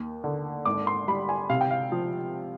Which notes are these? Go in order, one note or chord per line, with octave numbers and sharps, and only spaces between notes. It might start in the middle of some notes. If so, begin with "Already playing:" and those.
Already playing: D#2
D3
G#1 D6
C6
G3 B5
G#5
C3 F5
G5
F5
F3